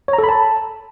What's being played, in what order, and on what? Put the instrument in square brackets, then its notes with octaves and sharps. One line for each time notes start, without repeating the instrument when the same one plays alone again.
[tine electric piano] C#5
A#5
A4
B5
A5